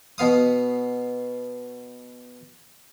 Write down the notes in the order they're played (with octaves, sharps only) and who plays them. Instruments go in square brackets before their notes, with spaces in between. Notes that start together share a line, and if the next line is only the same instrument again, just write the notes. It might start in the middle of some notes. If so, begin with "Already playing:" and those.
[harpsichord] B2 B3 F5 D#6